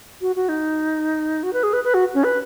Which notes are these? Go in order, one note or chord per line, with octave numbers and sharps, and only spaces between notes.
F#4
F#4
D#4
F#4
B4
G#4
B4
B4
F#4
C#4
B4